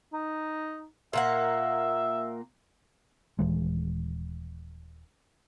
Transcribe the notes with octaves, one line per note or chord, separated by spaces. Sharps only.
D#4
A#2 A#3 E5 F#5
D#1 E3 G#3